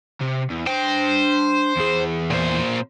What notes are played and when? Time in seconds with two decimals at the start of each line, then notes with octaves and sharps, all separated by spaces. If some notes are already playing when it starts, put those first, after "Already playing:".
0.21 C3
0.50 E2
0.67 D4 C5 G5
1.77 E2 G#4
2.30 A#2 C5